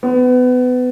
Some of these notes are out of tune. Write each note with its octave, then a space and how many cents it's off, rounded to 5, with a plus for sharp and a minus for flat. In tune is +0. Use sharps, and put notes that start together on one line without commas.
B3 +25